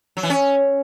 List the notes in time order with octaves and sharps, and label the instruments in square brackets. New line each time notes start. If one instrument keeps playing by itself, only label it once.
[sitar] F#3
E3
C#4